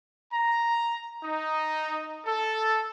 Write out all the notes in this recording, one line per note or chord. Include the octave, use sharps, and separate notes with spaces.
A#5
D#4
A4